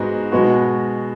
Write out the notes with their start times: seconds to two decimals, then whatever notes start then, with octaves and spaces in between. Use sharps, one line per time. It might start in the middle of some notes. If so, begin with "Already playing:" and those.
Already playing: G#2 G#3 B3 F#4
0.32 B2 G#3 B3 F#4